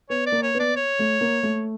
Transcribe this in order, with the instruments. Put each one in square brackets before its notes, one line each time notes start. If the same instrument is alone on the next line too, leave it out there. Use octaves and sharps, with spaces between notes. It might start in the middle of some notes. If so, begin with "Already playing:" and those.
[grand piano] B3 [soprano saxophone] C#5
[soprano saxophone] D5
[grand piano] A#3
[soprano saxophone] C#5
[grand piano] B3
[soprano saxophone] D5
C#5
[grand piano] A3
A#3
A3